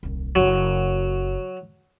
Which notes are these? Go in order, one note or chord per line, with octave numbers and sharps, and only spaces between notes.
D#1 C2
F#1 F#2 F#3